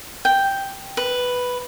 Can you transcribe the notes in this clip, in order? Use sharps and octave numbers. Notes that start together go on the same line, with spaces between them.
G5
B4